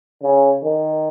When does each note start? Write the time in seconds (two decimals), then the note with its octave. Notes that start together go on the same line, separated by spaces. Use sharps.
0.23 C#3
0.63 D#3